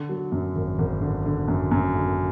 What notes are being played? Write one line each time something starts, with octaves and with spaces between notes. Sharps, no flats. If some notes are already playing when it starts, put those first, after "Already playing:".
Already playing: D3
F#3
F#2
G#1
G#1
D3
D3
F#2
F#2
D3